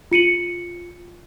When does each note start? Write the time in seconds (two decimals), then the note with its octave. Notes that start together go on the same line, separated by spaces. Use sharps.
0.11 F4 C#7 D#7 F#7